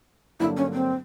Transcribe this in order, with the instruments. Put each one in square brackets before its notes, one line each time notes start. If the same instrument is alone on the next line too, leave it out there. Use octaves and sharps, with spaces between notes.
[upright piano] G2 D3 F#3 A#3 D4 [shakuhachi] E4
[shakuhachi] C#4
C4